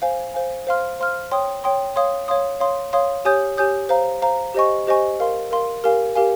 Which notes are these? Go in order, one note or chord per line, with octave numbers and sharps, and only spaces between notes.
C5 F5 G#5
C5 F5 G#5
C5 F5 C6 F6
C5 F5 C6 F6
C#5 G5 C6 D#6
C#5 G5 C6 D#6
C#5 F5 C6 D#6
C#5 F5 C6 D#6
C#5 F5 C6 D#6
C#5 F5 C6 D#6
G4 C#5 G#5 D#6 G6
G4 C#5 G#5 D#6 G6
C5 F5 A#5
C5 F5 A#5
G4 C5 D#5 G#5 C#6
G4 C5 D#5 G#5 C#6
A#4 F5 C6
A#4 F5 C6
G4 A#4 F5 G#5
G4 A#4 F5 G#5